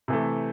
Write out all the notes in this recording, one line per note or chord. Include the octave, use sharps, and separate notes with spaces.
C3 E3 A3